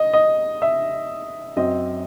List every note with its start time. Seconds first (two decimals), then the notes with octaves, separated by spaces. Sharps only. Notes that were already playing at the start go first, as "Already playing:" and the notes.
Already playing: D#5
0.13 D#5
0.62 E5
1.56 F#2 F#3 C4 D#5